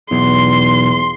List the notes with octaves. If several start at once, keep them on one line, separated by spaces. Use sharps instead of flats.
B1 E2 C6